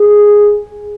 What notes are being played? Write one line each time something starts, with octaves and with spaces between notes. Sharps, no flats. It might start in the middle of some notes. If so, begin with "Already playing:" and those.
Already playing: G#4